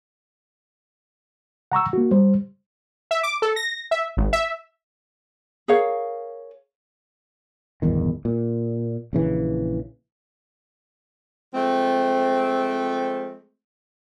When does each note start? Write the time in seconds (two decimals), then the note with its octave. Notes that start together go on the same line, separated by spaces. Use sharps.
1.72 F#5 A#5 C#6 E6
1.93 A#3 F#4
2.11 G3 C5
3.11 E5
3.23 D6
3.42 A4
3.56 A#6
3.91 E5
4.17 G#1
4.33 E5
5.68 G#4 A#4 C#5 F5
7.82 D1 G1 E2 D#3
8.25 A#2
9.13 A#1 C#3 E3
11.54 F3 G#3 A3 C4